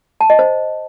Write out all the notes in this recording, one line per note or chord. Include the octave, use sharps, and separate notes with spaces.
A5
D#5
C5